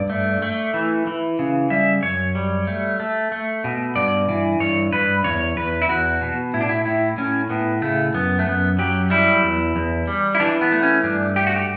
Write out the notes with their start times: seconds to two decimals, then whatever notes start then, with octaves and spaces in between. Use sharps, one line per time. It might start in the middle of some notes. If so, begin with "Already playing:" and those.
Already playing: G2 D5
0.10 A3
0.42 A3
0.74 E3
1.07 E3
1.39 C#3
1.70 G3 E5
2.03 F#2 C#5
2.35 G3
2.67 A3
3.00 A3
3.32 A3
3.64 B2
3.96 G2 D5
4.29 E3
4.60 G2 C#5
4.92 G2 B4
5.24 E2 C#5
5.57 E2 B4
5.82 E4
5.89 E2 F#4
6.21 B2
6.54 A2 E4
6.61 D4
6.69 E4
6.85 A2 E4
7.17 A2 C#4
7.50 A2 B3
7.82 C#3 A3
8.14 F#2 B3
8.39 A3
8.46 F#2 B3
8.79 F#3 G4
9.10 G3 E4
9.43 E2
9.76 E2
10.07 G3
10.35 E4
10.40 E3 D4
10.61 B3
10.72 A3
10.83 C#4
11.03 G2 D4
11.36 A3 G4
11.47 F#4
11.56 G4